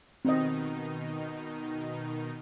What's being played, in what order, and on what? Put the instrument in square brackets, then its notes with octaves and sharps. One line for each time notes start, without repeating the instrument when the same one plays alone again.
[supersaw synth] B2 D#3 D#4 [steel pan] C4 D#5